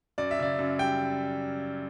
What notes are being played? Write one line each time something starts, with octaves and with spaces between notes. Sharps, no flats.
F#2 D5
E5
C#3 D5
F#2
G3 G5